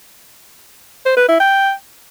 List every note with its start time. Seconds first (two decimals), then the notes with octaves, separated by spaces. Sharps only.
1.06 C5
1.17 B4
1.29 E4
1.40 G5